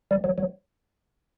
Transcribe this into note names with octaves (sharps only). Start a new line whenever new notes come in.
G3
F#3
F#3